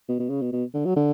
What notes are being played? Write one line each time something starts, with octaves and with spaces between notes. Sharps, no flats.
B2
B2
C#3
B2
B2
D3
F#3
D3